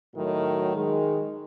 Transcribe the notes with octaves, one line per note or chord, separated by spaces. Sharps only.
A2 D#3 F#3
D#3 G#3